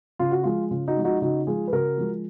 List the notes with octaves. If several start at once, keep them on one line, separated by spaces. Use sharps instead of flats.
C#3 F4
F#4
F3 G#3 F4
C#3 F4
D#4 F#4
F3 G#3
D#4 F#4
C#3 D#4 F#4
F3 G#3 F4 G#4
B4
C#3 F#4 A#4
F3 G#3